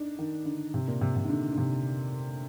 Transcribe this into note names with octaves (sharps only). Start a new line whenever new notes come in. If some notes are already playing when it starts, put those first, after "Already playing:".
Already playing: D4 D#4
D#3
D3
C3
A#2
C3
C3
D#3
D3
D3
C3